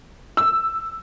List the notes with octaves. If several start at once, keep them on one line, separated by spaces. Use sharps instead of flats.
E6